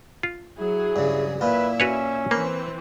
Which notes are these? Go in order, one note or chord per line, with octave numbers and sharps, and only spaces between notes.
F4
F#3 E4 G#4
G2 C#3
A#2 E4 F4 B4 E5
C#4 F#4 B4 C#5
E3 A#3 C4 B4